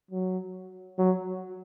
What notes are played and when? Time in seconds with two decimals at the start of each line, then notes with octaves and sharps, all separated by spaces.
0.11 F#3
0.98 F#3